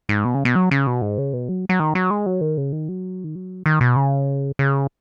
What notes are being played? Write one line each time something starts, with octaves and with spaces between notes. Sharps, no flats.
G#2
B2
C#3
B2
F#3
C#3
B2
G#2
C#3
B2
F#3
F#3
D#3
F#3
G#3
F#3
D#3
C#3
D#3
F#3
D#3
F#3
D#3
B2
C#3
C#3